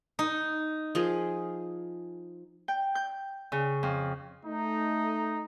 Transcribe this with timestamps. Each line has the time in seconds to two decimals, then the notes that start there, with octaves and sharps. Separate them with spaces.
0.19 D#4
0.95 F3 G#4 A#4
2.68 G5
2.95 G6
3.52 C#3
3.83 F2
4.44 A3 D#4